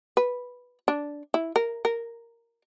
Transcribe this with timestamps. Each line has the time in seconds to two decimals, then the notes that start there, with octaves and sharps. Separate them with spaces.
0.17 B4
0.88 D4
1.34 E4
1.56 A#4
1.85 A#4